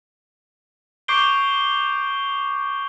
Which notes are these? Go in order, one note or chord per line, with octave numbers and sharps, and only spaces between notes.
C#6 D6 G6 C7 D7 G7